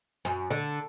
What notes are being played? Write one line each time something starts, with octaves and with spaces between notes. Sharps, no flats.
F#2
D3